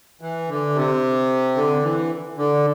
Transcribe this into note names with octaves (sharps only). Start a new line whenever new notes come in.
E3
D3
C3
D3
E3
D3